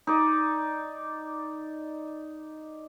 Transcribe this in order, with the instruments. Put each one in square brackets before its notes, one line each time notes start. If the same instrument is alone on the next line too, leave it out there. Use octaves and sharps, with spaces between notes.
[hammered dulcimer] D#4 D5